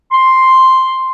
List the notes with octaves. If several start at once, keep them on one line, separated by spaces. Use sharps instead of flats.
C6